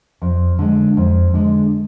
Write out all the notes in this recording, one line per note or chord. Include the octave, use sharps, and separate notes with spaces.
F2
D3 G#3
F2
D3 G#3